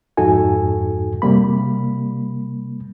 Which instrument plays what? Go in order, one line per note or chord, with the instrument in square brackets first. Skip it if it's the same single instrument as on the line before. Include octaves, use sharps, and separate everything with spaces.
[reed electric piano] F2 G#2 D#4 F#4 A4 G#5
C3 G3 A#3 B5